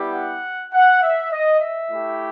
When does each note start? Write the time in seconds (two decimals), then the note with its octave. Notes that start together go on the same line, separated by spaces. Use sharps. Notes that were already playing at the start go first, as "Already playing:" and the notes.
Already playing: G3 B3 E4 G4
0.14 F#5
0.73 F#5
1.02 E5
1.32 D#5
1.61 E5
1.90 A3 E4 G4